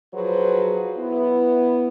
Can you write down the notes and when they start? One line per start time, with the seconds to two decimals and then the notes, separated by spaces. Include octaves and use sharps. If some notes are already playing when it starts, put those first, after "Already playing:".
0.14 F3 F#3 F#4 G#4 B4 C5
0.98 B3 E4